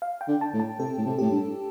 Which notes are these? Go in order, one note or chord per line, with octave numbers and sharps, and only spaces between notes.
F5
G5
D3
A5
A2
A5
C3 A4
A2
C3
A2 G4
G2